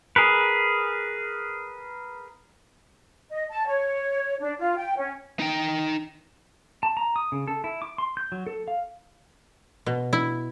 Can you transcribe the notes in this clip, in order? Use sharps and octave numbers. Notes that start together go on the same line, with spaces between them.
G#4 A#4 B4
D#5
A5
C#5
D4
F4
G5
C#4
D#4 G5
A5
A#5
D#6
C#3
A4
E4
D6
C6
G6
F#3
A4
F5
B2
E4